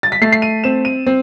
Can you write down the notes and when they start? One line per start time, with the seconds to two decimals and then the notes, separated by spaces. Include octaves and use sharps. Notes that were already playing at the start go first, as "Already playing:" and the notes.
0.03 A6
0.12 B6
0.21 A3 C7
0.32 C7
0.42 D#7
0.64 C4 E7
0.85 D#7
1.07 C4